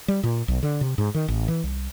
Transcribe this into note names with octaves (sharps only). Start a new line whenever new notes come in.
G3
A#2
B1
D3
C3
G#2
D#3
A1
E3
C2